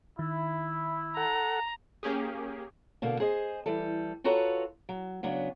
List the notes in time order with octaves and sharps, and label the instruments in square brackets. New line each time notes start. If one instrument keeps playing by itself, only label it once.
[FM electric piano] D#3 [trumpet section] E4
[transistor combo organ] A4 F#5 [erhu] A#5
[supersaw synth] A#3 C#4 G4 G#4
[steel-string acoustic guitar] B2 D3 A#3
G#4 C5 D#5
E3 G3 A4
F4 F#4 A4 B4 C#5 A#5
F#3
C#3 F#3 B3 D4